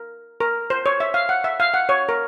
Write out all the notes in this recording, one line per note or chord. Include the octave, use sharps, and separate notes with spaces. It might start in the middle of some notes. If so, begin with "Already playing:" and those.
Already playing: A#4
A#4
C5
C#5
E5
F5
F#5
E5
F5
F#5
C#5
A#4